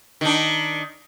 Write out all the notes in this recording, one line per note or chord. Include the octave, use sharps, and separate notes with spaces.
D#3 D4